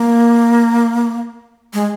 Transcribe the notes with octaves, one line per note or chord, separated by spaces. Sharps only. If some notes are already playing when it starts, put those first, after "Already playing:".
Already playing: A#3
G#3